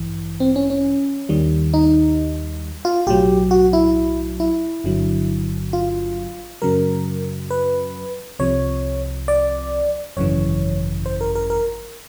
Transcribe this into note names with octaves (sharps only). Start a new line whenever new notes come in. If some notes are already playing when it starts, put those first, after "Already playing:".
Already playing: A1 G2 E3
C4
C#4
C#4
D#2 D#3 G3
D#4
F4
B1 A2 F#3 G4
F#4
E4
E4
G1 G2 D3 F#3
F4
F#2 C#3 F#3 A#4
B4
C2 C3 F3 C#5
D5
G#1 F#2 C#3 E3 C#5
C5
A#4
A#4
A#4